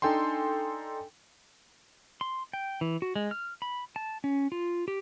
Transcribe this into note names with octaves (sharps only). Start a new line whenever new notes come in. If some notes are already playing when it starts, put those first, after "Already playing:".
D4 D#4 A4 G5 G#5 C6
C6
G5
E3
F#4
G#3
F6
B5
A5
C#4
F4
G4